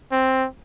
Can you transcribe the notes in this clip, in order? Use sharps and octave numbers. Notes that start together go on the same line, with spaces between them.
C4